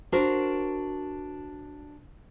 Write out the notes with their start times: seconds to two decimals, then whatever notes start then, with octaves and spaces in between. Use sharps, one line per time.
0.12 D4 F#4 A#4 C5